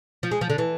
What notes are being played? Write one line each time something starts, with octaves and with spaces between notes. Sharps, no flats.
F3
G#3
F3
D3
E3